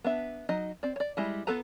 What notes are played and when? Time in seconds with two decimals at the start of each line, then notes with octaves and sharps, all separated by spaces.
0.04 B3 D4 E5
0.49 F#3 D#4 D#5
0.83 C4 D5
0.96 C#5 D5
1.17 G3 G#3 E4
1.47 B3 F4 A4 B4 A#5